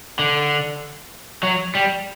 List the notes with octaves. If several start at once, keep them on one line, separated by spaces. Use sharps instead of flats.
D3
F#3
G3